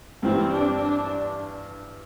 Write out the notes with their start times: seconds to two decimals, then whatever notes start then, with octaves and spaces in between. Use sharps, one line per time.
0.23 G2 E3 G3 C4
0.52 D4
0.81 D4